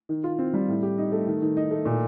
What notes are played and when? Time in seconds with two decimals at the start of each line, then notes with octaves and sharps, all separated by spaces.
0.09 D#3
0.24 F4
0.39 C4
0.54 G3
0.68 A2
0.83 G4
0.98 D#4
1.12 A3
1.27 D#3
1.42 D#3
1.57 D#4
1.71 A3
1.85 A#2